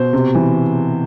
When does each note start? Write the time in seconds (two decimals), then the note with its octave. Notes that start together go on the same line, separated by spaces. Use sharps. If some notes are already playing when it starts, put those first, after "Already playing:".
Already playing: B2 C5
0.13 C3
0.35 E3